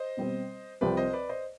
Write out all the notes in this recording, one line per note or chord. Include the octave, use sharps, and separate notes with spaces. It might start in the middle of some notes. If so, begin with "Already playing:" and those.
Already playing: C5 D#5
B2 G3 C4
C2 C3 F3 C4 G4 B4 D5
C5 D#5
B4 D5
C5 D#5